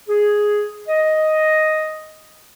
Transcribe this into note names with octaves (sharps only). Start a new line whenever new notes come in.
G#4
D#5